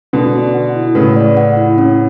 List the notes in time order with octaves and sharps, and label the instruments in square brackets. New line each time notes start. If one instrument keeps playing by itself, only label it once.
[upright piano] B2 D3 [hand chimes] B4
[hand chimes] D5
F#5
E4
[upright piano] A2 C#3 [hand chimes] B4
[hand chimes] D5
F#5
E4
C#4